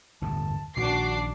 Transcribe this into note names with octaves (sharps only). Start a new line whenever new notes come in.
G1 E2 A2 A5
A#1 A#2 D#3 D4 F#4 D6 C7